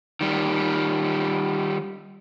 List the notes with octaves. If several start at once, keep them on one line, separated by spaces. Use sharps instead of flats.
D#3 G3